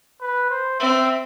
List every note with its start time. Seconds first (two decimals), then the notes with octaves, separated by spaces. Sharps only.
0.21 B4
0.50 C5
0.80 C4 E5